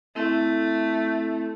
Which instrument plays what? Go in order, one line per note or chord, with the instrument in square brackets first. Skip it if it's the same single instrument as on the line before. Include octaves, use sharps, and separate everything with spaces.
[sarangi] A3 [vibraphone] C4 E4 A4